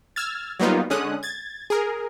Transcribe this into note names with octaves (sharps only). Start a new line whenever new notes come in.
E6 F6 G#6 A6
F#3 G3 A#3 B3 D#4 F4
D3 G#3 C#4 D#6 F#6
G#6 A6
G#4 A#4